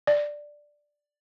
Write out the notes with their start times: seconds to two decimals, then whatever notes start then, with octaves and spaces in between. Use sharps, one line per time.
0.07 D5